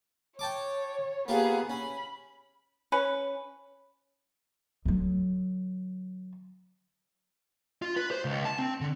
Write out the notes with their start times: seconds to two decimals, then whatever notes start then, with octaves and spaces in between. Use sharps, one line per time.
0.39 C#5 G5 A5 D6
1.28 A#3 B3 F4 G4 G#4
1.70 C#4 B5
2.92 C#4 B4
4.85 D3 F#3
7.82 F4
7.96 B4
8.11 C5
8.25 C#2
8.45 A5
8.59 C4
8.81 D3